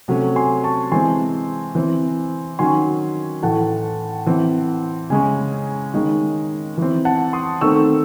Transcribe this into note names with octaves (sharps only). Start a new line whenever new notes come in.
C3 F#3 A3 C#4
G#5 C6
A5 C#6
E3 G#3 C4 G#5 C6
E3 C4
D#3 F#3 C#4 G#5 C6
A2 E3 A3 F#5 A5
E3 C4
C#3 G#3 C#4 G#5
D#3 G#3 C#4
E3 C4
F#5 A5
C6 D#6
D#3 A3 C4 C#6 E6